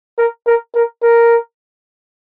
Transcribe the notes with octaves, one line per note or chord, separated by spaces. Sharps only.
A#4
A#4
A#4
A#4